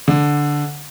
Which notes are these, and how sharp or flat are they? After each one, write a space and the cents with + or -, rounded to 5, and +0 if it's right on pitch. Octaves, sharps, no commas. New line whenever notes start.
D3 -5